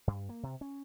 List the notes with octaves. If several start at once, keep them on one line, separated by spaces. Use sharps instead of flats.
G2
A#3
C3
C#4